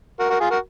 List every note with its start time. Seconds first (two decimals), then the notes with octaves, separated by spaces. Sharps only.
0.19 F#4 A#4
0.30 F#4 A#4
0.40 F4 G#4
0.50 F#4 A#4